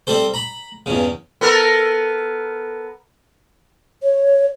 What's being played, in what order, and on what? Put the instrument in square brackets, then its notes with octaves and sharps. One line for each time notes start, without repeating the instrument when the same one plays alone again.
[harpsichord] G3 C4 A4 C5
A#5 B5
E2 G2 C#3
[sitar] B3 A4 A#4
[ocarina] C#5